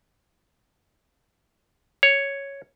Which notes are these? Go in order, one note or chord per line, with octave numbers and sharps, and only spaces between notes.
C#5